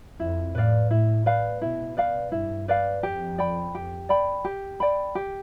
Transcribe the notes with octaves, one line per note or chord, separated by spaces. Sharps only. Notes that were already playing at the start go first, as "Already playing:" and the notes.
F2 E4
A2 B4 D5 F5
A2 E4
B4 D5 F5
B2 E4
B4 D5 F5
G2 E4
B4 D5 F5
F2 G4
D5 G5 B5
G4
D5 G5 B5
G4
D5 G5 B5
G4